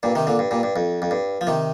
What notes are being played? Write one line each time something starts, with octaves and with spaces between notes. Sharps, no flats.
G2 A#2
C3 D#3
A#2 D3
G2
G2 A#2
G2
F2
F2
G2
F3
C3 D#3